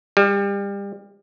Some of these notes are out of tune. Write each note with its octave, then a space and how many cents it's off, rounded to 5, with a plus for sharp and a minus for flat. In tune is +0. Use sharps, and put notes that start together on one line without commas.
G3 +30